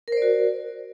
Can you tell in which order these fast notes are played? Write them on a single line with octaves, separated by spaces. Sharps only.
A#4 C5 D5 F#4